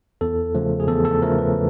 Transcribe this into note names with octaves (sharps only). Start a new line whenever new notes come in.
E2 A4
C#3 F3 A3
G#4
E2 A4
A4
C#3 F3 A3 A#4
B4